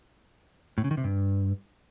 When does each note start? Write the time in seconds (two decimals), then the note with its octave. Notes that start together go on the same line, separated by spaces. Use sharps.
0.78 A2
0.84 C#3
0.91 D#3
0.97 C3
1.04 G2